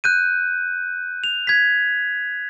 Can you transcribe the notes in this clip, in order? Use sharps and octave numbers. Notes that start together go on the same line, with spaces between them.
F#6 G6 D#7
F7
G#6 B6